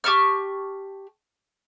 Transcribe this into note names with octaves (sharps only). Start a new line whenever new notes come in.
G4 A5 C#6 F6